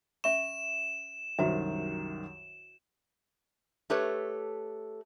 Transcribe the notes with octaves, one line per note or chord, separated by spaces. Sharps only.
C#4 E5 C#6 E7
C2 F#2 D#3 F#4 C5 E5
A3 G4 A4 B4 C#5